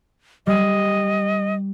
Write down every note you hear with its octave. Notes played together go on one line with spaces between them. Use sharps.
G3 D#5